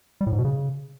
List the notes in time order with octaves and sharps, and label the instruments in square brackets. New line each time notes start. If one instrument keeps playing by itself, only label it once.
[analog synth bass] G3
A2
G#2
B2
C#3